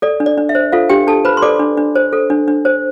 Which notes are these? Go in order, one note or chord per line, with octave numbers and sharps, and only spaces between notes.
A4 D5
D4
D5
D4
E5
C5
F4 A4 F5
D4 G4 G5
D4 A4 A5
B4 C5 B5
C6
A4 D5 D6
D4
D4
C5
A4
D4
D4
C5